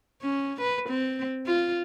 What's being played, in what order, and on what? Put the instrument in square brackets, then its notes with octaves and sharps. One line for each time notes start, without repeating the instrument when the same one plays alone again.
[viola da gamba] C#4
B4
C4
F4